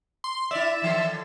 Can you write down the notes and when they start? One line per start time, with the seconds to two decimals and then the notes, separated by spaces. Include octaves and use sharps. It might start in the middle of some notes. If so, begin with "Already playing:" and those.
0.24 C6
0.51 E4 D5 E5
0.82 D#3 E3 A4